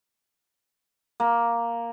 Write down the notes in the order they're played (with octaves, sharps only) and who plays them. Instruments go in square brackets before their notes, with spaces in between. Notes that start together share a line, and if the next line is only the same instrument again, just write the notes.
[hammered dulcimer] A#3